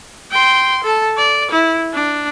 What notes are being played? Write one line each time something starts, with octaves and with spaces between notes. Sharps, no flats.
G5 C6
A4 A5
D5
E4
D4